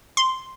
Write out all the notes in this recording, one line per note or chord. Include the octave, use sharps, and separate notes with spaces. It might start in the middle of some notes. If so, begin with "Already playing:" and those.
C6